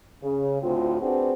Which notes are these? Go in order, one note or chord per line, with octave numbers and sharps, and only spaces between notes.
C#3
D2 A2 C4 F4
C4 D4 F#4 G#4 B4